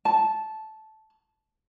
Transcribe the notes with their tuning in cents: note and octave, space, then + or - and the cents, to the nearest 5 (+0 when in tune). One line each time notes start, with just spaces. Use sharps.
A5 -10